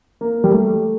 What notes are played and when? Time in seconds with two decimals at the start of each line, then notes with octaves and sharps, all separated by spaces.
0.21 A#3
0.44 G3
0.51 A3